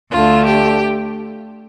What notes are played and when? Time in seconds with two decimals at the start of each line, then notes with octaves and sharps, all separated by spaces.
0.12 D2 D3 A3 F4
0.46 G4